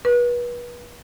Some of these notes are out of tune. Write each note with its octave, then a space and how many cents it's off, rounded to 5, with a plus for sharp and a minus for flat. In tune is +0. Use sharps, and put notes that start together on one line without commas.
B4 -35